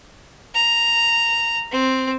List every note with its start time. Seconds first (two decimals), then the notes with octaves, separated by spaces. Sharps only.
0.55 A#5
1.72 C4